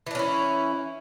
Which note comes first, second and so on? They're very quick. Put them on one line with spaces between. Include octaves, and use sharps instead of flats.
E3 D4 C#4 E4